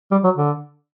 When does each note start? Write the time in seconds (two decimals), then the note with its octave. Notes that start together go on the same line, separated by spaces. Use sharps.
0.11 G3
0.24 F#3
0.36 D3